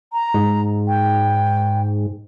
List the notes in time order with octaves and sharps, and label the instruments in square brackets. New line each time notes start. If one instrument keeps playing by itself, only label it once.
[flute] A#5
[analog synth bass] G#2
[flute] G5